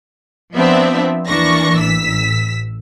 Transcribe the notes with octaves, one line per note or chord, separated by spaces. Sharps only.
F3 B3 C4 D4 E5
D#2 E3 A#3 D4 C#6 A#6
A1 E6 B6